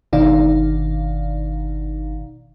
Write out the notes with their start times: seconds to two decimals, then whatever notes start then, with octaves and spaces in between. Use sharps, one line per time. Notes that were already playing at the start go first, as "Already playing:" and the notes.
0.13 G1 B2 D#3 D#4 D5 F5